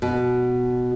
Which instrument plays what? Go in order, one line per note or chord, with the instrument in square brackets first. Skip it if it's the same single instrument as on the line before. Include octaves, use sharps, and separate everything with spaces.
[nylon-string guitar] B2